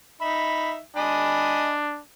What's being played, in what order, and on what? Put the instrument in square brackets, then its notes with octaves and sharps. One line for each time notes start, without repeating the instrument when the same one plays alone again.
[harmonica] D#4 E5 [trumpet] B5
[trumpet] D4 [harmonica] D#5 G#5 B5